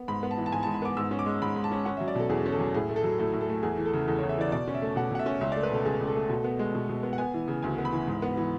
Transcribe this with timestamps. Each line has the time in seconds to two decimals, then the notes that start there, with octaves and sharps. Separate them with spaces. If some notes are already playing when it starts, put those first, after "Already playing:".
Already playing: B3
0.08 G#2 B5
0.23 B3
0.31 A5
0.38 E3
0.46 A5
0.52 G#2 G#5
0.63 A5
0.67 G#2
0.74 B5
0.82 B3 D6
0.97 G#2 E6
1.11 C#4
1.19 D6
1.26 G#3
1.42 G#2 B5
1.56 G#2
1.64 A5
1.71 C#4
1.85 C#4 F#5
1.97 E5
2.00 F#3
2.08 D5
2.15 B2 A4
2.29 E2 G#4
2.45 C#4
2.52 A4
2.59 F#3
2.74 A2 G#4
2.89 A3
2.96 A4
3.03 F#3
3.18 A2 A4
3.33 A2
3.41 A4
3.49 A3
3.63 E2 G#4
3.78 E3
3.86 A4
3.93 C#3
4.08 E2 A4
4.19 C#5
4.23 E2
4.29 E5
4.38 E3 D5
4.52 B2 D5
4.68 C#4
4.74 E5
4.82 A3
4.96 B2 F#5
5.11 B2 F#5
5.19 E5
5.26 C#4
5.41 C#2 E5
5.52 D5
5.56 A3
5.63 B4
5.71 B2 A4
5.85 C#2 G#4
6.00 C#2
6.07 A4
6.15 A3
6.29 B2
6.44 B3
6.59 G#3
6.75 B2
6.89 B2
7.03 B3
7.13 F#5
7.18 B3 G#5
7.34 E3
7.48 C#3
7.63 D2 G#5
7.78 B3
7.85 B5
7.92 E3
8.07 G#2
8.22 B3
8.37 E3